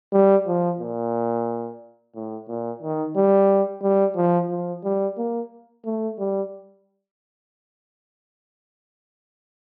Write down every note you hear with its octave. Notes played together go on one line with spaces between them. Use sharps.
G3
F3
A#2
A2
A#2
D#3
G3
G3
F3
F3
G3
A#3
A3
G3